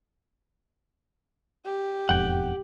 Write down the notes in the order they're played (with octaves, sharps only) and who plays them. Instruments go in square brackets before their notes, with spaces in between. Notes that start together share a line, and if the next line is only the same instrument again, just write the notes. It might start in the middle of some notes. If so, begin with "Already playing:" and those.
[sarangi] G4
[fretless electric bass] E1 F2 G#2 [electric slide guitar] F#5 G5